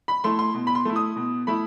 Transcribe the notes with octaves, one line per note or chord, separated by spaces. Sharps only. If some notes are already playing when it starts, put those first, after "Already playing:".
B5
A3 E4 C6
C6
B2
B5
C6
A3 E4
D#6
B2
A3 E4 B5